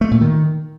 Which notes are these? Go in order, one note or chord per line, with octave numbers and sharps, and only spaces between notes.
A3
A#2
D#3